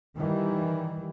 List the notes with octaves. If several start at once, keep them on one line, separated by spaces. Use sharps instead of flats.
D#3 E3 G3